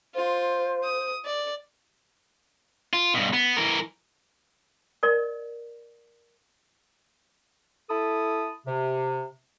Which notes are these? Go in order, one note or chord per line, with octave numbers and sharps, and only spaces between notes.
F4 C5
D#6
D5
F4
G2 B2
B3
E3 A#4
A#4 D5 D#5
E4 A4 A5 B5 D#6
C3